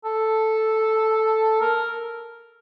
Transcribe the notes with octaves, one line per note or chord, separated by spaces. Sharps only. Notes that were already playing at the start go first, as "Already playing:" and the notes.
A4
A#4